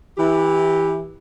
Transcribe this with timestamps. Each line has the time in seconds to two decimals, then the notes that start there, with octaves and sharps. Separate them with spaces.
0.18 E3 G4